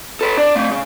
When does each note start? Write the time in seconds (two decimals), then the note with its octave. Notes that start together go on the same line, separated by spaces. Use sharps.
0.21 A4 B4
0.37 D4
0.55 A3 C4
0.71 C#3